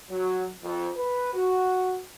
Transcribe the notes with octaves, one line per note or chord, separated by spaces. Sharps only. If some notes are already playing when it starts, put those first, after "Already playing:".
F#3
F2
B4
F#4